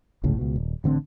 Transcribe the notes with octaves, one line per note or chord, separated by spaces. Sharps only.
G1 C#2 A2 C#3
C#2 B2
D#1
A1 D3 A#3 C4